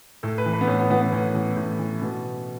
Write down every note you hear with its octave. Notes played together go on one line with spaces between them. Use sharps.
A2 A4
B4
E3
B4
B3
A2 C#4
B3
E3 B3
B3
A2 C#4
E3
A2
E3
B2